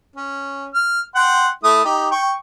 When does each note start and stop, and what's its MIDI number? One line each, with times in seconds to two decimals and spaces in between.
0.16 0.67 61
0.74 1.01 89
1.16 1.48 78
1.16 1.48 79
1.16 1.48 84
1.64 1.85 57
1.64 1.85 64
1.64 1.85 87
1.85 2.09 63
1.85 2.09 67
2.12 2.33 79
2.12 2.33 85